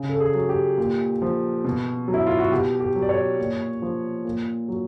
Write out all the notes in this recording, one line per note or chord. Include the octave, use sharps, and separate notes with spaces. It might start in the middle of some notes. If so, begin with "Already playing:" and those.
Already playing: C#3
A4
G#4
F#3
G4
A#2
F3
B2
F#3
E4
F4
F#4
B2 G4
G4
F#3
D5
C#5
A#2
F3
A#2
F#3